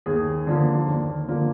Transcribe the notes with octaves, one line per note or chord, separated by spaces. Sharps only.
D#2 G#4
D3 F3 A#3
D#2
D3 F3 A#3